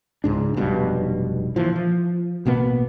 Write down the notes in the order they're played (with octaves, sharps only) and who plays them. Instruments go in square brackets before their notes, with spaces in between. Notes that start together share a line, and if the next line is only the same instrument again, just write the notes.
[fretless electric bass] C#2 G#2 D4
F1 B1 G2 B2
A#2 E3 F3
F3
A1 B2 A#3 B3